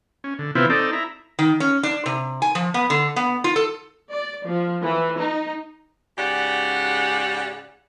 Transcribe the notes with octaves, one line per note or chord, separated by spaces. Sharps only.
C#4
D3
C3 E3 B3 C4 E4 F4
C4 D#4 A4 D5
E4 A#5
D#3
C#4
D4
C3
G#5
F3
B3
D3
B3
F4
A4
D5
F3
E3
D#4
G#2 C#3 F#4 G4 D5 F#5